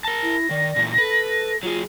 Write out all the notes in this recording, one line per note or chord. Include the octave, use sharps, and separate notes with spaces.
A#4 A5 A#6
E4
D#3 D5
A#2 E3
A4 B4
F#3 F4 G#4